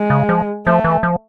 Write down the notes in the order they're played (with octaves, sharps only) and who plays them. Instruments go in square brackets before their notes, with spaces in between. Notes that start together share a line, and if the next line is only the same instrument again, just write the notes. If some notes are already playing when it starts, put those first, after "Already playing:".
Already playing: [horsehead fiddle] G#3
[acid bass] C#3
F3
[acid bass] F3 [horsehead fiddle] A3
[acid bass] E3
F3